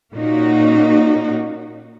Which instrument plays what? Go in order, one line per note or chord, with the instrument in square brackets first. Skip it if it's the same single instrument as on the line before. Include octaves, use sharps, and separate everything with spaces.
[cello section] A#2 A#3 C#4 D#4 F#4